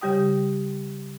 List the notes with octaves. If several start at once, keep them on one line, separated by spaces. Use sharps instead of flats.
C#3 G3 G4 G5 D#6